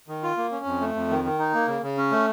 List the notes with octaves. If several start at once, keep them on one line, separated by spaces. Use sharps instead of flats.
D#3
F4
A#3
C#4
F2
A3
F2
D#3
D#3
D#4
A#3
C#3
C#3
C#4
A3